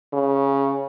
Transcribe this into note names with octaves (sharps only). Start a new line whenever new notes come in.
C#3